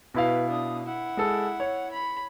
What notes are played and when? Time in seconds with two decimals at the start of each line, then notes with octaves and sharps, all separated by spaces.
0.14 B2 E4 B4 F5
0.49 D4 D#6
0.86 E4 F#5
1.17 G#3 A4
1.60 C#5
1.92 B5